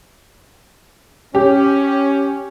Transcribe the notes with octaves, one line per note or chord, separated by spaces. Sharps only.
C#4 G4